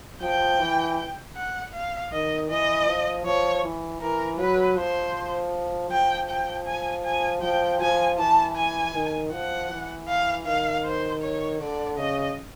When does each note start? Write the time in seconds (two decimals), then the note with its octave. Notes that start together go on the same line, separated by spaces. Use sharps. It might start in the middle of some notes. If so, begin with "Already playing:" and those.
0.21 F3 G5
0.60 E3
1.36 F#5
1.73 F5
2.12 D#3 D#5
2.49 E3 D#5
2.87 F3
3.25 F3 C#5
3.63 E3
4.01 E3 A#4
4.38 F#3 B4
4.76 F3 C5
5.91 F3 G5
6.29 G5
6.66 G#5
7.05 G#5
7.42 F3 G5
7.81 F3 G#5
8.19 E3 A5
8.56 G#5
8.95 D#3
9.32 F3 F#5
9.70 E3
10.08 F5
10.46 D#3 F5
10.85 C5
11.22 C#5
11.60 D3 D5
11.98 C#3 D#5